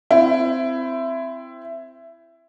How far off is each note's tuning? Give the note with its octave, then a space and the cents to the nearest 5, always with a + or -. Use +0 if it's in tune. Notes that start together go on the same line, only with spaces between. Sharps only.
C4 -10 E4 +15